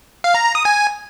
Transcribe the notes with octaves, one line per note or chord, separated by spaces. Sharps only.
F5
A#5
A#5
D#6
G#5